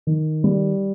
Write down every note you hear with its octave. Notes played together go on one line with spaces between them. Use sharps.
D#3
G3